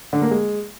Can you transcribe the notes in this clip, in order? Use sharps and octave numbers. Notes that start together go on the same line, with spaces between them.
D3
A#3
G#3